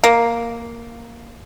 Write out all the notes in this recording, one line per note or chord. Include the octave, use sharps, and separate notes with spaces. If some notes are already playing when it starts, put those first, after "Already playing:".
A#3